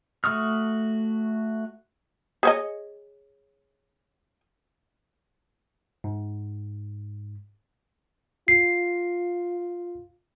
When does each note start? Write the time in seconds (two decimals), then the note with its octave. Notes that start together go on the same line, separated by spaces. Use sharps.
0.24 A3 F#4 C#6 D#6 F6
2.43 G#4 C#5 D#5
6.04 G#2
8.48 F4 C7